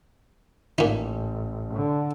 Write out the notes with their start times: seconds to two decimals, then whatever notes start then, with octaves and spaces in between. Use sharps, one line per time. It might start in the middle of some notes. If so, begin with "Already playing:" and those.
0.78 A1 A#2 D#4
1.75 D3